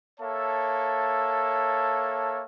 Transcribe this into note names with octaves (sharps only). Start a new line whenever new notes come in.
A#3 A4 C#5 E5 A5